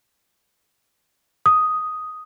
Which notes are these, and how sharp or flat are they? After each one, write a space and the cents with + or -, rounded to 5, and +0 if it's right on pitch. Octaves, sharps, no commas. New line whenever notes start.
D#6 +0